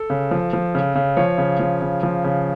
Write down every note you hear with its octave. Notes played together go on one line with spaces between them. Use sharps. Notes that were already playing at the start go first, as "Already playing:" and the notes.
Already playing: A4
C#3
F3
F3
C#3
C#3
F3 C#5
C#3
F3
C#3
F3
C#3